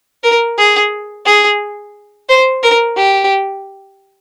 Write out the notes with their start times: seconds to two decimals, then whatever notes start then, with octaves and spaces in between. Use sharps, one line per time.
0.24 A#4
0.58 G#4
1.26 G#4
2.29 C5
2.63 A#4
2.97 G4